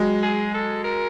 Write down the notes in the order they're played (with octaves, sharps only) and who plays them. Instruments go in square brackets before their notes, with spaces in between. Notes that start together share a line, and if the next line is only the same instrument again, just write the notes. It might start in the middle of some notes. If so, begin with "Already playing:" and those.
Already playing: [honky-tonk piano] F#3 G#3
[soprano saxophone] G#4
A4
A#4